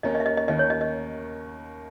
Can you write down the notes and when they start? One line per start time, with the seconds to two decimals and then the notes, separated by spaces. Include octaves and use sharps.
0.03 D#2 D#3 A#3 C#4 D#5
0.15 D#5
0.20 E5
0.26 D#5
0.37 D#5
0.48 D#2 D#3 A#3 C#4 D#5
0.59 C#5
0.70 D#5
0.81 D#5